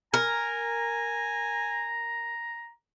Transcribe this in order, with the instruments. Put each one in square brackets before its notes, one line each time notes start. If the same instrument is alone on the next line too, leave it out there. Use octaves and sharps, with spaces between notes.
[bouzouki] A#4 [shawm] G#5 [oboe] A#5